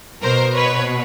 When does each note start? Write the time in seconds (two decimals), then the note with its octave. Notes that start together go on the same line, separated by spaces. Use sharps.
0.22 B2 A#4 C5
0.55 B4 C#5